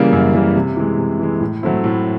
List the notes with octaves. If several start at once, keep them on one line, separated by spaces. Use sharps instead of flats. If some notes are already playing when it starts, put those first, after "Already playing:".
Already playing: C#3 E3 G3 A#3
F#2
C#3 E3 G3 A#3
C3
E3 G#3
C3
E3 G#3
A2
F#3 A3 C4 E4
A2